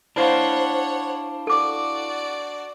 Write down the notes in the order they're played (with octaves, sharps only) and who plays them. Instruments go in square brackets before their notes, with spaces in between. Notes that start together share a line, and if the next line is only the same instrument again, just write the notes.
[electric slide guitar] D4 C5 [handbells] E4 F5 [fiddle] C#5 F#5
[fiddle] F#4 D5 [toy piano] A4 D6